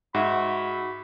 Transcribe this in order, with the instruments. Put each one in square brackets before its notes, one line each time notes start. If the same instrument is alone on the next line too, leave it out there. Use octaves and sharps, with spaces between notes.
[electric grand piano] G#2 E5 [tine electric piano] F#4 [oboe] B5